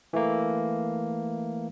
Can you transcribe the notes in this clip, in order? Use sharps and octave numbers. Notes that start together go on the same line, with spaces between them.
E3 A3 A#3